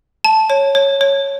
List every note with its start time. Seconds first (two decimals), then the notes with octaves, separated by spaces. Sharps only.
0.25 A5
0.50 C#5
0.75 C#5
1.01 C#5